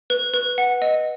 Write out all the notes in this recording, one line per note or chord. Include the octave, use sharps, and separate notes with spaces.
B4
B4
F#5
D#5